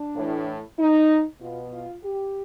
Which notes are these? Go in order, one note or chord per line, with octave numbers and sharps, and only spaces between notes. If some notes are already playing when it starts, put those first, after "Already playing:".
Already playing: D4
A2 E3
D#4
B2 F4
F4
G4